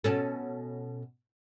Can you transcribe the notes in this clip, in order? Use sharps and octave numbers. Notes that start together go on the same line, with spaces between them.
B2 C#4 A4